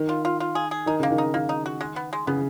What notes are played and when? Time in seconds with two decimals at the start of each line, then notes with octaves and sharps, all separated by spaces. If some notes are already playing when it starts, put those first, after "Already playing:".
Already playing: D#3
0.09 F4
0.25 F4
0.40 F4
0.55 G#4
0.71 G#4
0.86 D#3 D#4
1.00 C#3 A#3
1.10 D#3
1.18 D#4
1.34 D#3 A#3
1.49 D#4
1.66 F#4
1.81 G#3
1.96 B3
2.13 G#3
2.27 C#3 B3